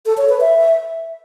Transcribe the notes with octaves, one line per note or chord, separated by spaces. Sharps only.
A4
C#5
B4
E5